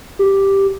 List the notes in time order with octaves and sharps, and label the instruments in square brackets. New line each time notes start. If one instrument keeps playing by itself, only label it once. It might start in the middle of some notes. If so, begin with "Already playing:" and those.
[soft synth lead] G4